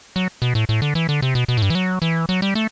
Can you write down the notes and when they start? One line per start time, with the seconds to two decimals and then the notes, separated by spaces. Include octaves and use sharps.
0.16 F#3
0.42 B2
0.55 A2
0.69 A2
0.82 D3
0.95 E3
1.09 D3
1.22 C3
1.35 B2
1.48 B2
1.57 A2
1.62 G2
1.70 E3
1.75 F#3
2.02 E3
2.29 F#3
2.42 G3
2.55 A3